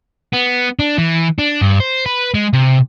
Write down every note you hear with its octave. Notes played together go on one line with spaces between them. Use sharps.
B3
D4
E3
D4
G2
C5
B4
G#3
C3